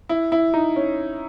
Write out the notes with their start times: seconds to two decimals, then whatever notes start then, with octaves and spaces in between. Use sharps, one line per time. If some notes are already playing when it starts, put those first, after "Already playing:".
0.09 E4
0.32 E4
0.54 D#4
0.76 C#4